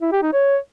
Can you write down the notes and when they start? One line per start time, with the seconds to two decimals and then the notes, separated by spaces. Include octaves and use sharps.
0.02 E4
0.12 G4
0.23 D#4
0.33 C#5